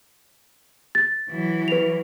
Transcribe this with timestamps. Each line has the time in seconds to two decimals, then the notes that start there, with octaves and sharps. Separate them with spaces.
0.95 A6
1.30 E3 F#3
1.68 B4 F7